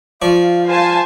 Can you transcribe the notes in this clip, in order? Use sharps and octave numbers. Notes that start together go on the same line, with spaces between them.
F3 D5 F5 C#6
C5 G#5 A5